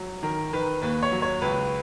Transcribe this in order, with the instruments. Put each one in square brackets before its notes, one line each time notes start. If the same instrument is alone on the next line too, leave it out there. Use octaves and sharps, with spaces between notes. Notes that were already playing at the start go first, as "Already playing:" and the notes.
Already playing: [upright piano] F#3
D#3 A#4
D#3 B4
D#2 B4
C#5
F#3
C#5
C#2 B4